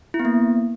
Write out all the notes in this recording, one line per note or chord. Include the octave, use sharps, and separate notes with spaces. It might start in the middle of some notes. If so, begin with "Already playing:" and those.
E4
B3
A#3